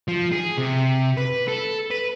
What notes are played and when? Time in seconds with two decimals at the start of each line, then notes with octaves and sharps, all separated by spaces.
0.08 F3
0.32 G#4
0.58 C3
1.17 B4
1.48 A4
1.91 B4